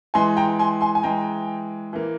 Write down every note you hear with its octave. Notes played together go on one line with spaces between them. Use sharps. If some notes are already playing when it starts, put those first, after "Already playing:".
E3 G#3 G#5 C6
G5 A#5
G#5 C6
G#5 C6
G#5
E3 G#3 G5 A#5
E3 A#3